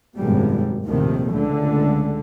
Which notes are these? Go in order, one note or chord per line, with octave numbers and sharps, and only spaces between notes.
G#1 F#2 B2 G3 G#3
A#1 D#2 A2 C3 D#3
C#2 D3 A3